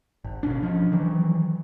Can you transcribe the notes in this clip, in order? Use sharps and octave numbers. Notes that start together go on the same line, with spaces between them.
G#1
B2 C#4 D4
F3 C#4
D#3 E3 F#3